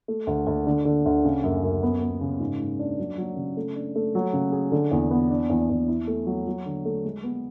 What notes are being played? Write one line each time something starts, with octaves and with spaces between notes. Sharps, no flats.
A3
D2
D2
D3
D3
D2
C#3
F#2
F#2
B3
B3
C#3
G#2
G#2
D4
F#3
F#3
C#3
A3
D4
A3
F#3
C#3
G#4
D3
E2
B3
D4
E2
E2
E4
A3
F#3
F#3
D3
A3
G#3
B3